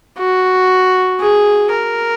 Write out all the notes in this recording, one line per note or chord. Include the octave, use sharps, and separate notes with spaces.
F#4
G#4
A#4